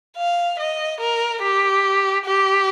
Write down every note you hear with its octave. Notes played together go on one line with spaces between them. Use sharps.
F5
D#5
A#4
G4
G4